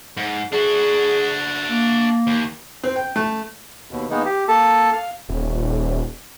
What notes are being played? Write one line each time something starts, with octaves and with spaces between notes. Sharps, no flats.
G#2
D4 F#4 G#4
A#3
D#2
C4
G5
A3
D#2 B2
D#3 G#3 A#3 B3 D#4
G4
A#3 A4 A5
F5
D#1